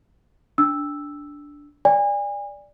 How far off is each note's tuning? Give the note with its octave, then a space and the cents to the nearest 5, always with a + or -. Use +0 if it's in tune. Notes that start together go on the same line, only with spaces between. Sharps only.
D4 -10 E6 +0
D5 +0 G#5 -35